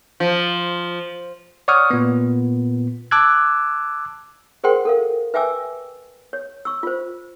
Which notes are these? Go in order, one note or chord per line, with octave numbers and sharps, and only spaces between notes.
F3
C#5 D5 F#5 C#6 D#6 F6
A#2 B3
A5 D6 E6 F#6 G#6
G#4 A#4 C5 F#5 G5 C6
A4 A#4 F5
B4 E5 G5 G#5 D6 E6
C#5
C#6 E6
F4 C5